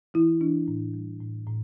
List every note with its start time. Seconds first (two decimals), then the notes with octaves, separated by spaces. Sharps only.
0.14 E3 E4
0.41 E3 D4
0.68 A2
0.94 G3
1.21 A2
1.47 A2